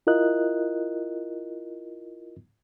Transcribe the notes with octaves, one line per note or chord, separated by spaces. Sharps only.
E4 F4 A#4 D#5 F#6